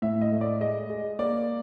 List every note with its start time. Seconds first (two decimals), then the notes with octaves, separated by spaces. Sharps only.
0.02 A2 E5
0.21 D#5
0.32 A3
0.41 D5
0.61 G#3 D#5
0.90 G#3
1.19 A#3 D5